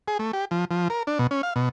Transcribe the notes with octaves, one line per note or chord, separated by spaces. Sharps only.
G#4
A3
G4
F3
F3
A#4
D4
B2
C#4
F5
B2